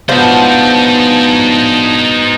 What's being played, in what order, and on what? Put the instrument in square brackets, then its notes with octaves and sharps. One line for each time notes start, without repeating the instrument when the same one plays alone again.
[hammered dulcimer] B2 B3 [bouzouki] F3 D4 [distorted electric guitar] D#4 C5